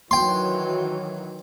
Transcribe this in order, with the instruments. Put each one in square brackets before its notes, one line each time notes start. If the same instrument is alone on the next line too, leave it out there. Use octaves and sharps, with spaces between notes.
[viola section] D#3 E3 F#3 [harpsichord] G5 C6